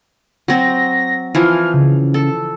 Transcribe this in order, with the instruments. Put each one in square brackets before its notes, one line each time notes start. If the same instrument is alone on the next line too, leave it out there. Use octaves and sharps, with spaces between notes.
[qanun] F#3 C4 [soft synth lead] A#6
[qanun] E3 F3 G#5 [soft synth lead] F6
[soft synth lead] C#3
[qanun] A4